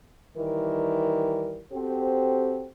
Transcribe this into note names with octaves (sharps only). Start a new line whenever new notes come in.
D#3 E3 G3 A#4
C4 F#4 G4 A4 C5